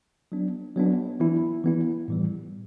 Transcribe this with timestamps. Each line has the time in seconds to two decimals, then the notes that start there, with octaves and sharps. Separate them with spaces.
0.32 F#3 B3 D4
0.76 F#3 B3 D4
1.20 E3 B3 E4
1.64 E3 B3 E4
2.08 A2 E3 G3